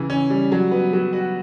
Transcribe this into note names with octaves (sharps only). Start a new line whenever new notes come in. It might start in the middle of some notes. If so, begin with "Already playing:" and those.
Already playing: C#3 E3
C#4
G3
F#3
B3
F#3
F#4